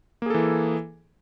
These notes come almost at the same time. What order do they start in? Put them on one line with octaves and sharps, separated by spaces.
A#3 G#4 A4 E3